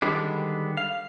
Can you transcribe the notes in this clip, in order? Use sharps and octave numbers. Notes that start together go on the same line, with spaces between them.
D3 D#3 G3 G#3 B3 D4
F5